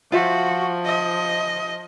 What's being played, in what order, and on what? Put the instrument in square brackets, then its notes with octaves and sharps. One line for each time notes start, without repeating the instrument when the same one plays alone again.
[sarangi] F3 [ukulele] F4 C5 E5 [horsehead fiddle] F#4
[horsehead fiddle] D#5